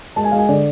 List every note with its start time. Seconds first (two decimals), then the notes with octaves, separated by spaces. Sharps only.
0.16 G#3 A5
0.24 G#5
0.31 G#3 F5
0.38 G#5
0.49 D3 D5